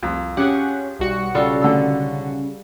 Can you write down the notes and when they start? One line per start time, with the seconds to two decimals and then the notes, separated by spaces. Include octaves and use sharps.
0.03 C2 F2
0.37 C#4 G4 G#4 F#5
0.99 B1 G3 F#4 C#7
1.35 C#3 G3 F4 A4
1.62 D3 E6